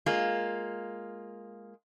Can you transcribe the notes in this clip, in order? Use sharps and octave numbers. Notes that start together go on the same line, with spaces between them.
G#3 A#3 F4